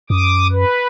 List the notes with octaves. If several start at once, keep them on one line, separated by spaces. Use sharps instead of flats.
F#2 D6 D#6
B4